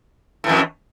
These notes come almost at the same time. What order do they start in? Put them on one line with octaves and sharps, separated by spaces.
A2 E3 F2